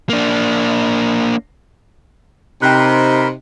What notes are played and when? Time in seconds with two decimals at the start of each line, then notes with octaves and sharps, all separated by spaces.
0.10 A#3 D4
2.62 C3 D#4 A#4 G5 B5 C6 F#6